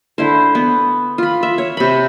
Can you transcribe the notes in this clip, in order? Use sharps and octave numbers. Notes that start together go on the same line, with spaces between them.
D3 E4 C5
B3
F4 B5
E5
C#5
C3 B5